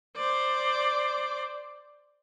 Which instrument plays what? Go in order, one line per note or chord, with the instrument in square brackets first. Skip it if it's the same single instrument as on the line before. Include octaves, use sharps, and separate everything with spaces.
[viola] C5 D5